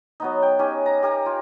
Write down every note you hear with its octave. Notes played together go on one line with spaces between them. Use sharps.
F#3 B3 D#4
G5
C#4 D#4 G4 G#5
A#5
G4 A#4 G#5 A#5
F4